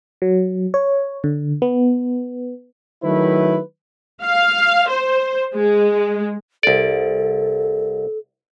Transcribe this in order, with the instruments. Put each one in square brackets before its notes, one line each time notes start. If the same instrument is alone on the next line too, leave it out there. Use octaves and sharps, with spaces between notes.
[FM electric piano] F#3
C#5
D3
B3
[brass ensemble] D#3 F#3 A3 E4 B4
[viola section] F5
C5
G#3
[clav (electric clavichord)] C2 D5 [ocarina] A4